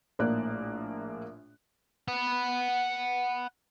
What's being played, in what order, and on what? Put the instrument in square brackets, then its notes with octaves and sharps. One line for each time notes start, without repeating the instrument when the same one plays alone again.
[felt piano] A#1 A2 A#3 D5 F#6
[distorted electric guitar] F#5 B5